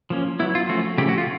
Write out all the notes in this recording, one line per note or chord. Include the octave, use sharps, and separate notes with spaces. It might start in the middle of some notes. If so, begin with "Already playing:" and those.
F3 A#3 C#4
F#3 B3 E4
F4
F3 A3 C#4 F#4
C#3 F3 A3 C#4 G4
F#4
F4